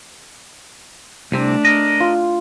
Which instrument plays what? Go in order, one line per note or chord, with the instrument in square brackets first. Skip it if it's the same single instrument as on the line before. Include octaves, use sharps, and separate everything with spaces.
[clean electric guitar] C2 C3 C4 [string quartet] A3 D4
[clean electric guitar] A#4 D#5
[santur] F4